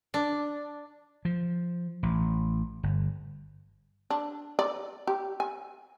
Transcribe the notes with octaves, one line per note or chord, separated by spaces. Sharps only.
D4
F3
A1
G1
D4
D5
G4
G#5